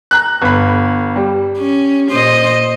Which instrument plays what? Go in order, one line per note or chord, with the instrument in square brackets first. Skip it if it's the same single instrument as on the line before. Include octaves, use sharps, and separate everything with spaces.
[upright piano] A#5 F#6
G1 B5
G3
[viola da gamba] C#4
A#2 C5 D#5